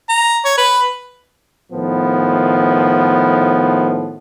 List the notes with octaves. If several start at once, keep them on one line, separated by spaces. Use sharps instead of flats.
A#5
C#5
B4
A2 D#3 F3 B3